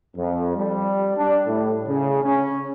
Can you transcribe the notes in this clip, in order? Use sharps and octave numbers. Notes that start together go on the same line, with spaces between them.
F2
G3
D4
A2
C#3
C#4